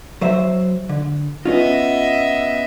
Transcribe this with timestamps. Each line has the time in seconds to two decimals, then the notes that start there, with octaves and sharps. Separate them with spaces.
0.21 F#3 C5 E5
0.89 D3
1.45 B3 C#4 F4 D#5 E5